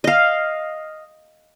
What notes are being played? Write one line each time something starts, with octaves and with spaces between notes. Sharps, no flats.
D#5 F5